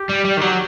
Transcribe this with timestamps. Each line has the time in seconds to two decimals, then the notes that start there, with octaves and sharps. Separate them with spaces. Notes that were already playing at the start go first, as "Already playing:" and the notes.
Already playing: G4
0.09 G3
0.25 G3
0.37 D#3
0.41 F#3